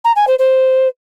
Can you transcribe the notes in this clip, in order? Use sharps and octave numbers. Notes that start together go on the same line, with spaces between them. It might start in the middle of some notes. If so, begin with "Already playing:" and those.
A#5
G#5
C5
C5